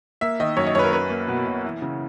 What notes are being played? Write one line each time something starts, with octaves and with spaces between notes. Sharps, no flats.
A#3 E5
D#3 D#5
F#2 C#5
D#5
F#2 B4 C#5
A#4
C#4 B4
A#3
B2
B2
E3
C#3